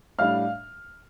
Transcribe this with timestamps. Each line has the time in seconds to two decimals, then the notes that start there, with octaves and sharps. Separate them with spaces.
0.19 A2 G3 D4 F5 F6